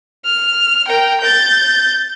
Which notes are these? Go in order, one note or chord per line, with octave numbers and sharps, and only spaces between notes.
F6
A#4 G5
G6 A6